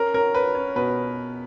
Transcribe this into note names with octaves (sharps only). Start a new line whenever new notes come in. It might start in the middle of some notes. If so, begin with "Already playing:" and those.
Already playing: C#4 A#4
C#4 A#4
C#4 B4
C#4
B2 B4